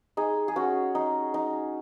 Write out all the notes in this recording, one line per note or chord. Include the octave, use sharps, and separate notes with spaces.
D#4 G#4
G#4
C#4 F#4
D#4
D#4